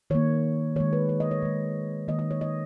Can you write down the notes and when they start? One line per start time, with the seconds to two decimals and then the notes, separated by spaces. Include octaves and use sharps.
0.10 D#3 A#3 C#5
0.76 D#3 G#3 C#5
0.93 B4
1.09 C#5
1.20 D#5
1.31 C#5
1.42 D#3 G#3
2.08 D#3 A#3 D#5
2.19 D#5
2.31 C#5
2.41 D#5